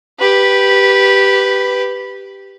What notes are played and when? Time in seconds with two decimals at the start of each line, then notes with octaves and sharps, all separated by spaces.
0.20 G4 B4